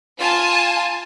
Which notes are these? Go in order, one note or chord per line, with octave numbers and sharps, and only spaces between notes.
F4 G#5 A5